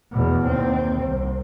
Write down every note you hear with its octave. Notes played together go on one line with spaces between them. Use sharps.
E2 B2
D#2 C4
C2